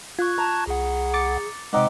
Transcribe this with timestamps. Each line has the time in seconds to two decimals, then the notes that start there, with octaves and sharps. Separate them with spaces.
0.19 F4 C#6 F#6 G#6
0.38 A5 A#5
0.67 C2 G#4 F#5
1.14 D6 A6 C#7
1.73 C3 G#3 C4 D#4 F#5 D6